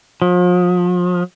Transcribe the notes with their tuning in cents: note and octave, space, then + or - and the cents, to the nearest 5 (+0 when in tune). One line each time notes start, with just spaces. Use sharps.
F3 +40